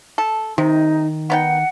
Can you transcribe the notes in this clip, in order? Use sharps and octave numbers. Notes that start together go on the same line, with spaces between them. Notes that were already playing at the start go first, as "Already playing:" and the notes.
A4
C3 D#3 D#4
B3 D#4 F#5 G5